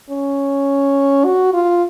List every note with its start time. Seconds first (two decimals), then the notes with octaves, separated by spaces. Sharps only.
0.10 C#4
1.25 F#4
1.53 F4